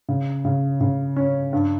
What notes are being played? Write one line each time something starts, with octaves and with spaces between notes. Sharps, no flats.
C#3
C#3
C#3
C#4
G2